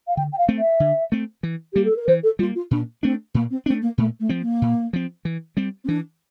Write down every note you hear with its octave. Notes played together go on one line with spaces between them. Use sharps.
F5
D3 G5
G5
F5
A3 C4
E5
D3
A3 C4
E3
G3 A#3 G4
A4
A#4
E3 C5
A4
G3 A#3 F4
F4
A#2 D4
A3 C4 D4
A#2 A#3
C4
A3 C4 D4
A#3
A#2 A3
A3
F3 C4
A#3
A#2
F3 C4
E3
G3 C4
C4
E3 D4